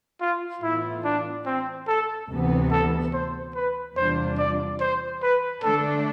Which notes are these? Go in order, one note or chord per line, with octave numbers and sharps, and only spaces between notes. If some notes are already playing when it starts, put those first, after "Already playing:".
F4
A2 E3 B3 E4 F4
D4
C4
A4
D2 C3 E3 B3
A4
C5
B4
E2 C3 G3 D4 F4 C5
D5
C5
B4
D3 A3 D4 A4